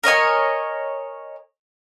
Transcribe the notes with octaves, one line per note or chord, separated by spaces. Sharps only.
A#4 C#5 D#5 G#5